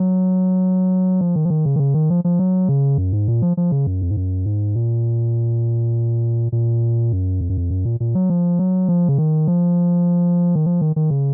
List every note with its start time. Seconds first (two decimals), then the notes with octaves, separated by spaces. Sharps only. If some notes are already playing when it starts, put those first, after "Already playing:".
Already playing: F#3
1.21 F3
1.36 D#3
1.45 F3
1.50 D#3
1.65 C#3
1.76 D#3
1.80 C#3
1.94 D#3
2.10 F3
2.24 F3
2.39 F#3
2.69 C#3
2.98 F#2
3.13 G#2
3.28 A#2
3.42 F3
3.57 F3
3.71 C#3
3.87 F#2
4.02 F2
4.11 G#2
4.17 F#2
4.46 G#2
4.76 A#2
6.52 A#2
7.12 F#2
7.41 F2
7.49 F#2
7.57 F2
7.70 F#2
7.85 A#2
8.00 A#2
8.15 F#3
8.30 F3
8.59 F#3
8.88 F3
9.09 C#3
9.18 D#3
9.48 F3
10.55 D#3
10.66 F3
10.81 D#3
10.96 D#3
11.10 C#3